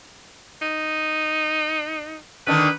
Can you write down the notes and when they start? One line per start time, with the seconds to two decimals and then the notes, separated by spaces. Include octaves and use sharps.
0.62 D#4
2.47 D3 D#3 D4 B4